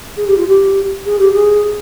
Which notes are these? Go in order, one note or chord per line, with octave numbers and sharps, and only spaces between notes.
G#4
G4
F4
G4
G#4
G4
G#4